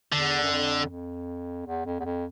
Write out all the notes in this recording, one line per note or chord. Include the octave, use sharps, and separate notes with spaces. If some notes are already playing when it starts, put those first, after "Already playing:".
E2 D3
F#2
F2
F2
E2
F2
E2
F2